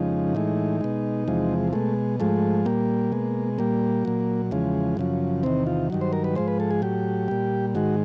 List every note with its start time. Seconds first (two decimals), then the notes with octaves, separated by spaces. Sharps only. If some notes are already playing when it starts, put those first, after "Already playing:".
Already playing: F2 C#3 F3 G#3 D#4
0.35 A2 E3 G#3
0.81 B2 G#3
1.28 E2 C3 F3 G#3
1.73 B2 G#3 A3
2.20 G#2 F3 G#3 A3
2.65 A#2 G3 A#3
3.12 B2 G#3
3.58 A#2 G3 A#3
4.05 A#2 F#3
4.51 E2 C#3 F3 G#3
4.97 F#2 C#3 F3
5.43 E2 C3 D#3 C4
5.67 F4
5.90 G2 D#3 F#3
6.01 C5
6.13 A#4
6.24 B4
6.35 G#2 F3 G#3 C5
6.48 B4
6.60 A4
6.71 G#4
6.82 A2 F#3 G4
7.28 A#2 G3
7.75 G#2 D#3 G#3 F#4